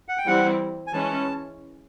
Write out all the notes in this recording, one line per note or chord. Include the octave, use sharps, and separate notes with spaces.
F#5
G5
E3 G3 C4 E4 F#5
G#5
E3 G#3 C#4 A5